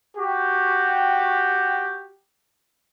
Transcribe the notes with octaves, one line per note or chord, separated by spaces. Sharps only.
F#4 G4